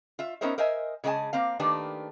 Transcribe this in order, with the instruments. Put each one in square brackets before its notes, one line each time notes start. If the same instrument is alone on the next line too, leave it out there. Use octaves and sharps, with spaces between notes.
[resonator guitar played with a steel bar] F4 E5
B3 C#4 D#4 A#4 C5 E5
A#4 C5 D#5 E5 G#5
C#3 G#3 C4 D#4 G#5 A5
A#3 C4 F5
D#3 A3 A#3 D4 G4 B4